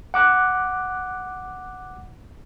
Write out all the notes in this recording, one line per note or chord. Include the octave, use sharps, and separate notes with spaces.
F#5 D6 F#6